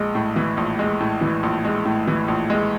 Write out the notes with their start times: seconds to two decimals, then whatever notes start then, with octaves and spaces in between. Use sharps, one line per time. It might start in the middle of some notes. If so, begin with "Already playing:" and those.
Already playing: A#1 G#3
0.15 A2
0.36 E3
0.57 A#1
0.79 G#3
1.00 A2
1.21 E3
1.43 A#1
1.65 G#3
1.85 A2
2.08 E3
2.28 A#1
2.50 G#3